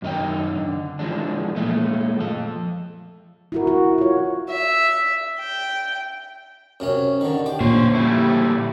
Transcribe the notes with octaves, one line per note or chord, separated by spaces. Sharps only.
F#2 D#3 D#4 D#5 G5
D3
E3 F3 G#3 D4
A#2 G#3 A3
F3 A4
E4 F#4 A#4
F#4
F4 C#5
E5
G5
F#2 C3 C#4
D3 D#3
G4
A#2 D3 F3 C#4 C5
G3 A3 E4